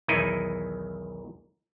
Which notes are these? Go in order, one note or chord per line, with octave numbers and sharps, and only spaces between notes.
B1 E2 D#3 D#4 E4 D#5